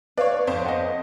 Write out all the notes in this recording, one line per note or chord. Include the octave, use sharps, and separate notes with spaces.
B4 C#5 D5 F5
F2 C5
D#5 F#5